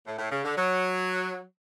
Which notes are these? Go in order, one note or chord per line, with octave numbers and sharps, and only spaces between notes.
A2
A2
C#3
D3
F#3